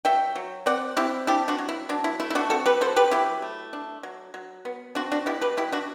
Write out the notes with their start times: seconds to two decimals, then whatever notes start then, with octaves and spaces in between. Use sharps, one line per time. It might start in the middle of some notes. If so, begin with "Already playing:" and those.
0.05 F#3 E5 G5
0.36 F#3
0.66 C4 D5 F#5
0.97 C4 E4 G4
1.27 D4 E4 G4
1.48 D4 F#4
1.58 F#3
1.69 E4
1.89 F#3 D4
2.04 E4
2.20 A3 E4
2.30 E4
2.35 D4 F#4
2.50 C4 F#4 A4
2.66 G4 B4
2.81 F#3 A4 C5
2.96 G4 B4
3.11 F#3 E4 G4
3.42 A3
3.73 D4
4.03 F#3
4.34 F#3
4.65 B3
4.95 C4 D4 F#4
5.12 D4 F#4
5.26 B2 E4 G4
5.41 G4 B4
5.57 B2 E4 G4
5.72 D4 F#4